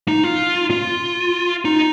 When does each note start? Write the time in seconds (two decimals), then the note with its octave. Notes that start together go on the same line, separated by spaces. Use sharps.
0.08 D#4
0.24 F4
0.70 F4
1.65 D#4